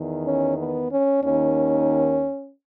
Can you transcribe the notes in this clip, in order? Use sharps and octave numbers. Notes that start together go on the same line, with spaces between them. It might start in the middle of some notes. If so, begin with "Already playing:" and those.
Already playing: E2 D#3
C#4
B3
C#4
D#2 D#3 C#4